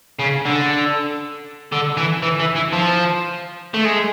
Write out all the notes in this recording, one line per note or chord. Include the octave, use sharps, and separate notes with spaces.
C#3
D3
D3
E3
E3
E3
E3
F3
A3
G#3